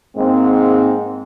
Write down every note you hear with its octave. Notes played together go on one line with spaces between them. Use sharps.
G#2 G#3 A#3 C4